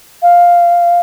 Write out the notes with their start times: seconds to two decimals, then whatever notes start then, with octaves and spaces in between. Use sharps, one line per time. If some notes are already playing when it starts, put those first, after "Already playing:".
0.22 F5